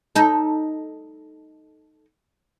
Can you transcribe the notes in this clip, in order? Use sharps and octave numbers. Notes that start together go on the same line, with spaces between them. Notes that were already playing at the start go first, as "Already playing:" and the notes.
D#4 A4